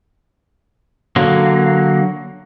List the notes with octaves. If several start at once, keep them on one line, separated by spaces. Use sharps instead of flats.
D3 F#3 A#3